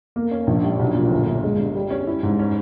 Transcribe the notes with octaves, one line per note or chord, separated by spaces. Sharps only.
A#3
C#4
A#1
G3
B1
A#2
G1
G1
G#3
G2
G3
C#4
E4
G#2
C#4